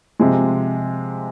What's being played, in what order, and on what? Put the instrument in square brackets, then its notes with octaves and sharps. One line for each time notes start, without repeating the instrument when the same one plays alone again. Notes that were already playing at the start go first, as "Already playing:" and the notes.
[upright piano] C3 F3 G#3